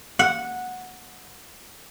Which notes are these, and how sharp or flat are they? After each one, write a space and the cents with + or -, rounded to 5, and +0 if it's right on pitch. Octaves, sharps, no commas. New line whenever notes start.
F#5 -10